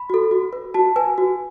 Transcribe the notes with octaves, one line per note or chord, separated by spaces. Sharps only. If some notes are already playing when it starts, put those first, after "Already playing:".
Already playing: B5
F#4 A4
F#4
B4
F#4 A5
B4 G#5
F#4